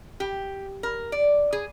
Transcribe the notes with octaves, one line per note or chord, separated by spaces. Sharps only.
G4
A#4
D5
G#4